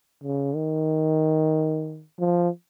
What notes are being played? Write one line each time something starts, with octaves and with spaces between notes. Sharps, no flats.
C#3
D#3
F3